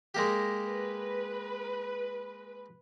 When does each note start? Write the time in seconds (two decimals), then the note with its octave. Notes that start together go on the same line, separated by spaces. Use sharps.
0.14 G#3 A#3 G4
0.67 B4